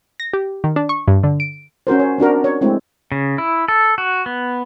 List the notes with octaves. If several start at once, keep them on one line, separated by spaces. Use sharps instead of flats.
A#6
G4
D#3
D4
C#6
G2
D3
D7
C#4 F#4 A#4 C5
C#5
C4 D4 F#4 A#4
C#5
G#3 A3 C4 E4
C#3
E4
A4
F#4
B3